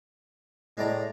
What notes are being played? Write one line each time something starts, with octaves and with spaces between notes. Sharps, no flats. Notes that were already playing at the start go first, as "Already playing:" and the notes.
A2 G#3 D5 A#5